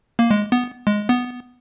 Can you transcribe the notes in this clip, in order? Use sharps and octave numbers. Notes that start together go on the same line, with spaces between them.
A#3
G#3
B3
G#3
B3